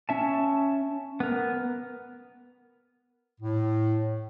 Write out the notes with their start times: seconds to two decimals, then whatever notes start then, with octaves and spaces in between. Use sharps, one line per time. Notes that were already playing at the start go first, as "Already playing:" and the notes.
0.09 C#4 E5 A5
1.20 B3 A#4
3.41 A2